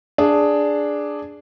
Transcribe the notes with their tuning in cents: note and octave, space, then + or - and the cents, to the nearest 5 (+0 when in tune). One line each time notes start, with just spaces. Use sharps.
D4 +0 G#4 +0